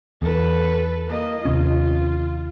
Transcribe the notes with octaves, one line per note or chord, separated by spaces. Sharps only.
E2 A4 B4
A#3 D#5
D#2 C3 C#4 F4